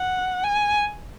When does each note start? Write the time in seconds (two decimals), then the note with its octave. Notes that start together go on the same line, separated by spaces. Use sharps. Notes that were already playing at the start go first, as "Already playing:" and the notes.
Already playing: F#5
0.44 G#5